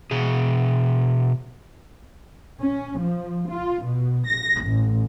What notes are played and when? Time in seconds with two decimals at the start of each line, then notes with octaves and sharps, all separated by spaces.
0.11 B2 G#4
2.61 C#4
3.00 F3
3.51 F4
3.85 B2
4.28 A#6
4.64 A1